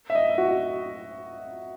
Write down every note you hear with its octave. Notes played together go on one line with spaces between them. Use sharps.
E5
D#5
F#4